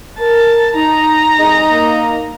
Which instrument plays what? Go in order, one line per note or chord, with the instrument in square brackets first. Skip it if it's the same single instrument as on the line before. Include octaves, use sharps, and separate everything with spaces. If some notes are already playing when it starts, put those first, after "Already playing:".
[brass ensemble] A#4 [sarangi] A5
[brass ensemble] D#4 [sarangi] A#5
[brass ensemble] C2 G#4 [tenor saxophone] D#4
[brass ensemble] A#3